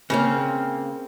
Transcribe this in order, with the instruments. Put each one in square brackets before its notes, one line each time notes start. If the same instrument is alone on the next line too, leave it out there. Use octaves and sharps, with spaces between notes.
[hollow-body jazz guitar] C#3 A#3 C4